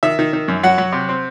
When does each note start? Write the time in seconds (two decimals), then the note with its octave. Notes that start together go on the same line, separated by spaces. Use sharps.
0.03 D#3 E5
0.19 D#3
0.33 D#3
0.48 F#2
0.63 F#3 F#5
0.78 F#3
0.93 C3
1.09 C4